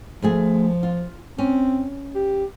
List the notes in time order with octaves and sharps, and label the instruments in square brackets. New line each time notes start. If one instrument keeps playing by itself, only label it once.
[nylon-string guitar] D2 A3 G#4 [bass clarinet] F3
[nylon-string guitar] F4
[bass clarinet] C4 [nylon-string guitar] C#4
[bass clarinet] G4